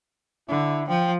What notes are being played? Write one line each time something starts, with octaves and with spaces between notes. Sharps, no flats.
D3 E4
F3 G5